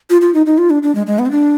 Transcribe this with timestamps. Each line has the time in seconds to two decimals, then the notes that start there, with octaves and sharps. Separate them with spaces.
0.10 F4
0.21 F4
0.34 D#4
0.46 D#4
0.58 F4
0.70 D4
0.83 D4
0.95 G#3
1.07 G#3
1.19 B3
1.26 C4
1.31 D4